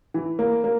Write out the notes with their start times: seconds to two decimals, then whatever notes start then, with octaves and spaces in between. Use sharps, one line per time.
0.14 E3
0.39 A#3
0.64 A#3